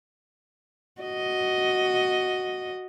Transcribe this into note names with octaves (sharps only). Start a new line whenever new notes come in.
F#4 D#5